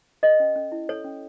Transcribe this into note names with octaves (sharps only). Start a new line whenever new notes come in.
A4 D#5
C#4
C#4
E4
A4 C#5
C#4